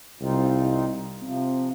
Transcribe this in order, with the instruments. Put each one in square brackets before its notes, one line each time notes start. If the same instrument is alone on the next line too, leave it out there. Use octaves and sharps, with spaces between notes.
[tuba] C2 [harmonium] C4 D#4 F4
[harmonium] C3 F3 [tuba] C4